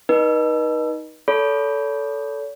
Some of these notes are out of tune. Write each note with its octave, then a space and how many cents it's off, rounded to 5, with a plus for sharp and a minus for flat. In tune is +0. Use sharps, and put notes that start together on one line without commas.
D#4 +10 B4 -40 D#5 -20
A4 +0 C#5 +40 B5 -5